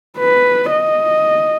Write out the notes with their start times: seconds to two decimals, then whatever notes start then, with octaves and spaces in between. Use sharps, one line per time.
0.18 B4
0.71 D#5